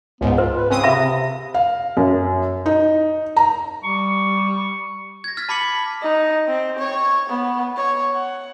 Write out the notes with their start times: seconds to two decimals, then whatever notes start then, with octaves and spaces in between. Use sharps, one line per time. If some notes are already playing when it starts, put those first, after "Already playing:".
0.21 C#2 G#2 B3
0.38 F4 C5
0.55 B4
0.70 C#3 C4 D#6
0.84 C3 E5 F5 B5
1.54 F5
1.97 F#2
2.66 D#4
3.37 A#5
3.83 G3 C#6
5.24 G#6 A#6
5.37 F6 G#6 A6 B6
5.49 A5 B5 D6 B6 C#7 F#7
5.61 B6
6.02 D#4
6.48 C4
6.79 C#5
7.30 B3
7.77 C#5
8.13 F#5